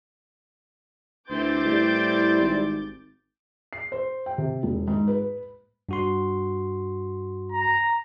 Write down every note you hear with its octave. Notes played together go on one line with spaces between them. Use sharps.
D2 E3 C4 C6 D6 G6 A6
A2 G3
G#1
C7
C5
G5
C3
E1
G#2
B4
G2 F#4 C6
A#5